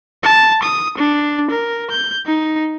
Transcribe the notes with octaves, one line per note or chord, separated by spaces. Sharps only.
A5
D#6
D4
A#4
G6
D#4